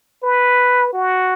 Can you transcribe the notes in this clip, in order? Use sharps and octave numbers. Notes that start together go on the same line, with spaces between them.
B4
F#4